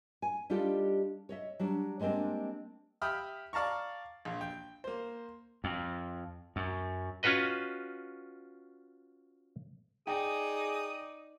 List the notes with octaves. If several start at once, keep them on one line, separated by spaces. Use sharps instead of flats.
G#5
G3 D4 D#4 F4 G4 A4
C#5 D#5 E5
F#3 G3 D4
G3 G#3 A#3 C4 D4
G4 E5 G5 B5 D#6 F6
D5 F5 A5 A#5 C#6
A#1
G5
A#3 C5
F2
F#2
C#4 F4 F#4 B4 D#5
D#4 G#4 D5 G5 D#6